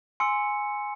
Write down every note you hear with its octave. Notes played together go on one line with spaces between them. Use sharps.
G#5 C6 E6 C#7